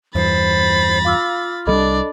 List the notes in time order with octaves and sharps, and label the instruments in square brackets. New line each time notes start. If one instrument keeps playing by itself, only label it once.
[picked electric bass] E2 G2 [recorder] C5 [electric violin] B5 A6
[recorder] F4 [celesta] F5 D6 E6
[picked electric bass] C2 F3 G3 [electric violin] D4 D5 [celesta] A4 D#5 B5